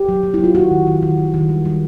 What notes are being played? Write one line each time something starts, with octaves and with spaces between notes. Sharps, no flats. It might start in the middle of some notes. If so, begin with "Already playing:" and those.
Already playing: G4
F#3
F#3
E4
F#3 F4
D#3 F#4
D#3
D#3
D#3
D#3
D#3
G3
G3